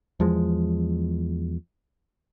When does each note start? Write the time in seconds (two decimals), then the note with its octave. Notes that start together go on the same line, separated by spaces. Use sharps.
0.20 E2 F3 G#3